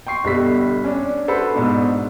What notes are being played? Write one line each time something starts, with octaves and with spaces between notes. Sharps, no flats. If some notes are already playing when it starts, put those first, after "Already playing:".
G5 C6 C#6 C7
G1 B2 G3 A4 B5 B6
C#4 D4
F#4 A4 B4 C5 B5
G#2 B2 D4